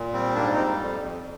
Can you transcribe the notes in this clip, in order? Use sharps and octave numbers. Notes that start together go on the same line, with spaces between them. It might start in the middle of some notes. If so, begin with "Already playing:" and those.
Already playing: A#2
G3 C4
G#2 A#3 D4
C4 D#4
G3
F2
F2